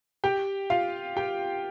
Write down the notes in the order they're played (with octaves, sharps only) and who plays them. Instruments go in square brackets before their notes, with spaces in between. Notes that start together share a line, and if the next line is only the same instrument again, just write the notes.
[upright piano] G4 G5
F4 F5
G4 G5